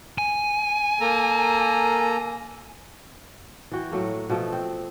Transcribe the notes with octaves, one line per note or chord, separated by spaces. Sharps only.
G#5
A#3 A4 A#5
E3 F#4 G5
A2 F#3 A3 A#3
B2 F3 A3
C4